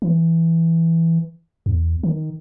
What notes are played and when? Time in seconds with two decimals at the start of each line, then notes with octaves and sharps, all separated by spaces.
0.02 E3
1.66 E2
2.03 D#3